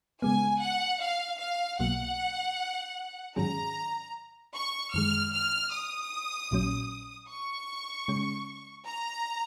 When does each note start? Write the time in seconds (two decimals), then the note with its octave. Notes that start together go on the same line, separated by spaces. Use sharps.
0.22 C#3 G#3 B3 G#5
0.62 F#5
1.01 F5
1.40 F5
1.79 B1 B2 F#3 A#3 F#5
3.36 G#2 D#3 F#3 C#4 G#4 A#5
4.55 C#6
4.94 F#2 D#3 G#3 F6
5.33 F6
5.72 D#6
6.51 A#1 A#2 F#3 C#4
7.29 C#6
8.08 C#3 G#3 C#4
8.87 A#5